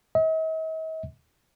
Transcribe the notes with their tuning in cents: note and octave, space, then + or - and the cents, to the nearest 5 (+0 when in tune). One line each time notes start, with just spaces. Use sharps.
D#5 +45